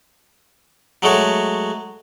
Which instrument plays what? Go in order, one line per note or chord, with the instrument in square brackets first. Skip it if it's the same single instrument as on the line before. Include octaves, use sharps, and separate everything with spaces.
[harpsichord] F#3 G#3 A3 F#4 C#5